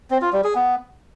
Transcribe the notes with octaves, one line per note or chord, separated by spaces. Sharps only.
C4
F4
G3
G#4
B3